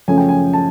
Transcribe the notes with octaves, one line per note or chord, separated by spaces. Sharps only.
F#2 C#3 F3 A3 C#4 G#5
G5
G#5
A5